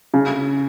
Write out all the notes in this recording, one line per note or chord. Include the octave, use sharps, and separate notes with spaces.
C#3